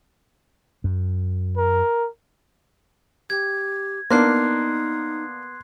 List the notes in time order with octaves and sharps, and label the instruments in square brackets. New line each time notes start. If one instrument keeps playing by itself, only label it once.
[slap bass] F#2
[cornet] A#4
[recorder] G4 [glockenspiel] G#6
[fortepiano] A#3 D4 [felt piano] B3 [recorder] D#4 [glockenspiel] C6 F#6 C7